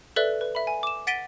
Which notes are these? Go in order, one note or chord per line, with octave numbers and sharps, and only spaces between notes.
A4 B4 D5 E5 F#6
B4
E5 B5
G#5
D6 E7
F#5 A6 B6 D7 D#7 G7